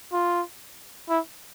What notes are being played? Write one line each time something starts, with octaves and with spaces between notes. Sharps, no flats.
F4
E4